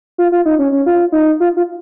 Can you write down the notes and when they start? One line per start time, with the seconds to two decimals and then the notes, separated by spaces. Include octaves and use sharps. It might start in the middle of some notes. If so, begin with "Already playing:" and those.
0.18 F4
0.32 F4
0.45 D#4
0.59 C#4
0.72 C#4
0.86 F4
1.12 D#4
1.40 F4
1.57 F4